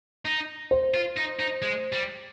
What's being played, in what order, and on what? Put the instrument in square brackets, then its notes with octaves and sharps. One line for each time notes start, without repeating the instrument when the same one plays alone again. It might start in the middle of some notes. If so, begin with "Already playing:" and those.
[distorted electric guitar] D#4
[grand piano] C5
[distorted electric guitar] F4
D#4
D#4
G#3
G3